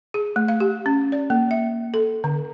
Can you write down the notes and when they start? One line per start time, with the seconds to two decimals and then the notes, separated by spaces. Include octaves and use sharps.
0.14 G#4
0.36 A3
0.48 F5
0.60 G4
0.86 C#4
1.12 D5
1.30 A#3
1.51 E5
1.94 A4
2.24 D3